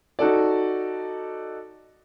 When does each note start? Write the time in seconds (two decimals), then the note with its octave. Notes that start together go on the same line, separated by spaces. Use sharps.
0.19 D#4 F#4 A4 D5